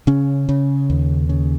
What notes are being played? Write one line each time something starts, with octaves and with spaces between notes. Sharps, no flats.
C#3 C#4
C#3
D#2
C#3